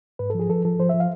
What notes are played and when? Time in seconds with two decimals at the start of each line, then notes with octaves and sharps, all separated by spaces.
0.19 G#2 B4
0.30 F3 A4
0.40 G#4
0.49 F3 A4
0.65 F3 A4
0.79 F3 C5
0.89 F3 E5
1.00 F5